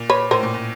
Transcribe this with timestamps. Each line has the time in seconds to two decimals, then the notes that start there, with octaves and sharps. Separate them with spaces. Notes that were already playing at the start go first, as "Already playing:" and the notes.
Already playing: A#2
0.10 B4 C#5
0.31 A2 A#4 C5
0.43 A#2
0.54 A#2